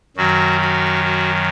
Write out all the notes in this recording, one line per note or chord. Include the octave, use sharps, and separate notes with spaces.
F#2 D#3 F#3 F#4
F#4
F#4